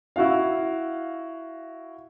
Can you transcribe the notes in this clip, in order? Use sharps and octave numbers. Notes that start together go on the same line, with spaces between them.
E4 F#4 F5